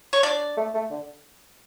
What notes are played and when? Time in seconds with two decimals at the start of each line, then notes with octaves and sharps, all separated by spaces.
0.13 C#5
0.23 D4 D5
0.57 A3
0.74 A3
0.91 D3